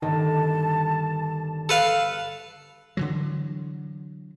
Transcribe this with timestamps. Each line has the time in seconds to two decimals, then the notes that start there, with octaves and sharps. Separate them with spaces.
0.02 G1 D#3 A5
1.69 A4 B4 F5
2.97 D3 E3 F#3